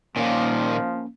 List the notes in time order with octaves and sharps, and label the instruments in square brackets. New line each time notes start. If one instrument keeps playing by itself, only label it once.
[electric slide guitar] A#2 D#3 [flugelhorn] F3 [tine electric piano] A#3 C#4